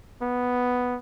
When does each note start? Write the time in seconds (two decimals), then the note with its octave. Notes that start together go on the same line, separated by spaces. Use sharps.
0.22 B3